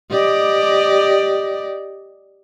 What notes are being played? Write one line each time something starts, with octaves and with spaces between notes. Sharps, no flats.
G4 D5 D#5